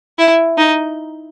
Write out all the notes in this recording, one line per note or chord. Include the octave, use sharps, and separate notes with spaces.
E4
D#4